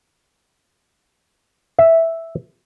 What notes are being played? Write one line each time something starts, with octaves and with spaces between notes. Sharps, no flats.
E5